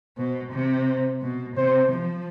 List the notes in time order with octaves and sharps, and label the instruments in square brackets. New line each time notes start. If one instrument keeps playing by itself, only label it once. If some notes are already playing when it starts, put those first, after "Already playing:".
[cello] B2 [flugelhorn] C5
[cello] C3
[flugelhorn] C5
[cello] B2
[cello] C3 [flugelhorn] C5
[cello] F3